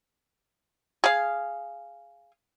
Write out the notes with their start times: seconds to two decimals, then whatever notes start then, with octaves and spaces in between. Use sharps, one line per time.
1.04 G#4 F5